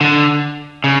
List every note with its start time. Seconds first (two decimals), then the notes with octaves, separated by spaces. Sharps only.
0.01 D3
0.84 C#3